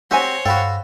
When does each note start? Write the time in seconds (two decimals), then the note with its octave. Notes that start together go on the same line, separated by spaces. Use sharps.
0.11 C4 F#4 G4 C5 C#5 G#5
0.46 G2 F#4 A4 F5 G5 B5